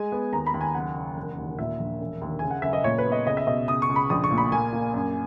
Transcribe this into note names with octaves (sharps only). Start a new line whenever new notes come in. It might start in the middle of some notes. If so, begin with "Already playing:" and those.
Already playing: G#3 G#5
B3
D#2 A#5
B5
D#2
G#5
F#1 F#5
F#1
E1
D#2
A#2 E5
A#1
E1
D#2
C#3 G#5
F#5
F#1 E5
D#5
A#2 C#5
B4
B3
D#5
C#2 D#5
E5
B2 D#5
C#2 D#6
C#6
C#2
B5
A#1 D#6
C#6
A#2
B5
A#3 G#5
A#3
F#2